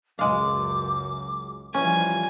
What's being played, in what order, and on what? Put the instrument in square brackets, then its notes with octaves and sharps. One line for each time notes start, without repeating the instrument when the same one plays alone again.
[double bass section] C#2 F#2 [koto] G#3 F5 [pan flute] D6
[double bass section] E3 F3 G3 [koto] C#4 [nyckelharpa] G#5